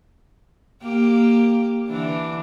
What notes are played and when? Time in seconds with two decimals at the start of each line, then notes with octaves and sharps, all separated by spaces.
0.82 A#3 G4
1.88 D3 E3 D4